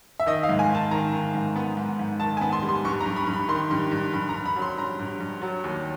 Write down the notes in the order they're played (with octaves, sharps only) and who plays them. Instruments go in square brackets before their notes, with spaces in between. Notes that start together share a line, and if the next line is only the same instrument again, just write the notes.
[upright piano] E5
D#3 D#5
F5
G#2
G#5
D#3
A5
D#3 A#5
D#3
G#2
B3
G#2
G#2
D#3 A5
G#5
B3
C6
G3
C6
G2 C#6
A#5
G2
B5
G2
B5
D#3 C6
G2
G2
G2 B5
A#5
G2
B5
F#3
C6
G2 A#5
G2
G2
F#3
D#2